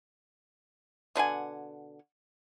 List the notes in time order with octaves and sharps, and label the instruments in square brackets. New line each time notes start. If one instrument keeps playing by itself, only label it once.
[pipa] B2 D3 F#5 G#5